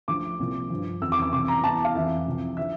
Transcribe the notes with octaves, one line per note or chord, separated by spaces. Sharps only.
D2 D3 F3 D6
C2 A#2 F3
G2 F3
F2 E3 E6
D6
D6
C2 C3 E3 D6
A#5
E2 E3 A5
F5
F2 E3 E5
C2 C3 F3
D3 F3 E5